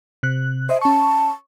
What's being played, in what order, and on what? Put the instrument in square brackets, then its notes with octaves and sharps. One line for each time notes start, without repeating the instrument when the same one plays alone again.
[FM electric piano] C3 F#6
[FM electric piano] C5 D#5 [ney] E5
[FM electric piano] C#4 C#6 [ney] A5